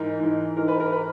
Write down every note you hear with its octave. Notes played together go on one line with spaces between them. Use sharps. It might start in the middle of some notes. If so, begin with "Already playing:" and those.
Already playing: G#2 E3 A#4
G#2 E3
G#2 E3 A#4
B4
A#4
B4